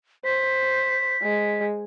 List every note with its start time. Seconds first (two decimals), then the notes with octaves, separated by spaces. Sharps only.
0.25 C5 B6
1.23 G#3